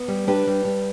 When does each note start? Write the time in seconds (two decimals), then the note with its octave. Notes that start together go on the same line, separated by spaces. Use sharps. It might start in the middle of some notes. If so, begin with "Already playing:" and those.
Already playing: B3
0.08 G3
0.27 D4 G4 B4
0.47 G3
0.65 G3